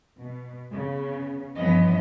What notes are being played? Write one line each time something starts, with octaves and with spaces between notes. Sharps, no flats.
B2
C#3 B3
G2 E3 F3 B3 C#4 D#5